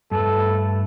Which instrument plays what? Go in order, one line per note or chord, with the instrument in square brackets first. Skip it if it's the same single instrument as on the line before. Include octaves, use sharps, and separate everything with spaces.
[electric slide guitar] G2 A3 B4 [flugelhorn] A4